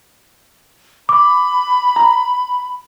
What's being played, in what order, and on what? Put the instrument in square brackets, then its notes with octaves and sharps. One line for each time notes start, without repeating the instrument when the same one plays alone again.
[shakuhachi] B5 [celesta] D6
[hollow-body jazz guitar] A#5